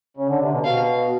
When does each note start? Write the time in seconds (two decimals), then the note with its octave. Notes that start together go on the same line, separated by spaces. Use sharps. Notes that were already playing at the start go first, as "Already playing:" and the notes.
0.17 C#3
0.29 D3
0.40 C3
0.52 B2
0.64 B2 F5